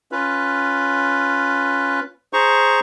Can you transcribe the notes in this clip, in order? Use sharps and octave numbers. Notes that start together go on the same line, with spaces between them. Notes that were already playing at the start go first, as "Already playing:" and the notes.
C#4 F4 B4
G#4 C5 A#5 C#6